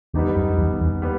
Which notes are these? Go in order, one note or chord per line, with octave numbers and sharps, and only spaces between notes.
E2 G3 B3 D#4 G4
F#2
E2
E2
G3 B3